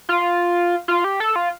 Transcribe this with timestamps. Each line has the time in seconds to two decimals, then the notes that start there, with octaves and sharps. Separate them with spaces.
0.09 F4
0.88 F4
1.04 G4
1.20 A4
1.36 F4